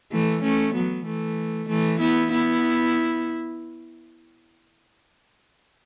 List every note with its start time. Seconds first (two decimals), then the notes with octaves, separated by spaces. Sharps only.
0.12 E3 A3
0.43 A3 C#4
0.75 F#3 B3
1.06 E3 A3
1.69 E3 A3
2.00 B3 E4
2.31 B3 E4